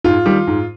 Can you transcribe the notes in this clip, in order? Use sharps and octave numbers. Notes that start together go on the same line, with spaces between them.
G#2 F4
D#3 G3
G#2